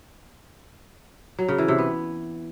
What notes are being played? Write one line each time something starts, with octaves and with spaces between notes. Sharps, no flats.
F#3
C#3
E3
C3
B3